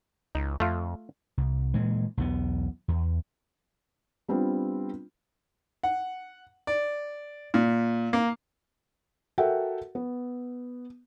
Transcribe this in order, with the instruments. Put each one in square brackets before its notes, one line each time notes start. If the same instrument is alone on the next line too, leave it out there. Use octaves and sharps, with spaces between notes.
[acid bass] C#2 [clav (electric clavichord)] D#4
[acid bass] F2 [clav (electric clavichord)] A3 F4
[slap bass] C2
A#2 E3 G#3
B1 E2 B3
E2
[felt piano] G3 B3 C4 D4 F4
[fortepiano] F#5
D5
A#2
A#3
[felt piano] F#4 A4 A#4 E5 F#5 G5
B3